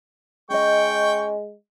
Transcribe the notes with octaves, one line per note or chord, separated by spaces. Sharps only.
G#3 C#4 D#5 G5 C#6